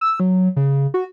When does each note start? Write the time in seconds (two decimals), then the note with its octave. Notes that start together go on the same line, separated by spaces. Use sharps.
0.01 E6
0.20 F#3
0.56 C#3
0.94 F#4